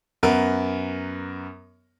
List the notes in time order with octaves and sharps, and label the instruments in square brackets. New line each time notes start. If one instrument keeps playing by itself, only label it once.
[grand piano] F#2 B3 A#4